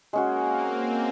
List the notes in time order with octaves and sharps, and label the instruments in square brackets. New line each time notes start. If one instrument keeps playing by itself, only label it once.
[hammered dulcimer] G#3 C#4 F#4 [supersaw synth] A#3
[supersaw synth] C4
A#3